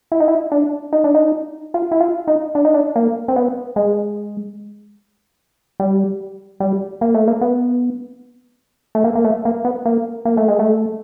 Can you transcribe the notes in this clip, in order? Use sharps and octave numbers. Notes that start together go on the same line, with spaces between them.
E4
D#4
E4
D4
D#4
D4
D#4
F4
E4
F4
D#4
D4
D#4
D4
A#3
C4
B3
G#3
G3
G3
A#3
A3
A#3
B3
A3
A#3
A#3
A3
A#3
B3
A#3
A#3
A3
G#3
A3